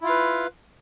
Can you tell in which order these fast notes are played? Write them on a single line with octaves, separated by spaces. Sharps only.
E4 F4 F5 B4